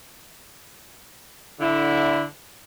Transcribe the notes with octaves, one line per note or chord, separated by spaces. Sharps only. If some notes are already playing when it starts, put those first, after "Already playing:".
D3 E4